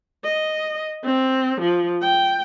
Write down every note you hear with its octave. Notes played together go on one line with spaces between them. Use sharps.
D#5
C4
F3
G5